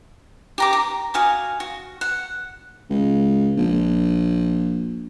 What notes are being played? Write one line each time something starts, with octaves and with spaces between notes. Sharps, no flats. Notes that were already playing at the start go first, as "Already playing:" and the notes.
G4 A#5 D6
A#5
F#4 F5 G#5 D#6
F#4
F#5
C#2
A#1